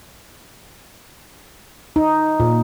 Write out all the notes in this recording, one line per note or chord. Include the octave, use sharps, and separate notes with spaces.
D#4
A#2